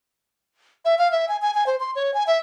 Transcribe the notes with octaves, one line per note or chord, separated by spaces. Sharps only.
E5
F5
E5
G#5
G#5
G#5
C5
C6
C#5
G#5
E5